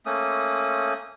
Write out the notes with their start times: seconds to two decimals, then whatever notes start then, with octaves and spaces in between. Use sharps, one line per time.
0.06 A3 A#3 C#4 D#6